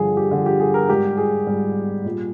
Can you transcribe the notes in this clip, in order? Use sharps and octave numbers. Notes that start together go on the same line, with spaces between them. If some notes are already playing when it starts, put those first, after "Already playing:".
Already playing: G2 D3 F3 G#4
G4
G2 D3 F3
G4
G#4
A#4
G#2 G3 G4
G#4
G#2 G3
A#2 G3